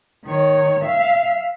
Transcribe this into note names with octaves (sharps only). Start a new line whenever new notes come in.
D#3 C#5
E5 F5